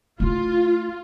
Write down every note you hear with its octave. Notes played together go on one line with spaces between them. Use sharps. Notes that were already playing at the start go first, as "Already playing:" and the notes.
A3 E4 F4